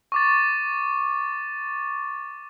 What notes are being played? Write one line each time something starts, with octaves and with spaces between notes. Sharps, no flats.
C#6 D6 A6